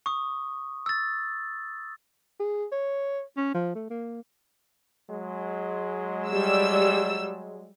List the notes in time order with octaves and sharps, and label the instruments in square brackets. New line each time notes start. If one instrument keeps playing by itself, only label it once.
[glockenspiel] C#6 D#6
E6 A6
[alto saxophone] G#4
C#5
C#4
F3
A3
A#3
[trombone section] F#3 G#3
[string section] G3 E6